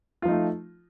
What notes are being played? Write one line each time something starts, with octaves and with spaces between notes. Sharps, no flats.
F3 A3 D#4 F4